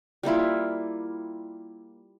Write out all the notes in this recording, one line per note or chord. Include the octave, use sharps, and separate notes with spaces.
G3 A#3 E4 F4